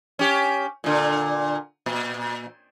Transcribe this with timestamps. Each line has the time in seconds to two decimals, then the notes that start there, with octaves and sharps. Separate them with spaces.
0.19 C#4 G4
0.84 A#2 D3
1.86 A#2